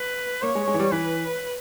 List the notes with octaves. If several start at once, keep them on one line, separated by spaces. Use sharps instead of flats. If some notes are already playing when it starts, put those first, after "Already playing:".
Already playing: B4
A#3 C#5
G#3
G#3
E3
G3
E3 B4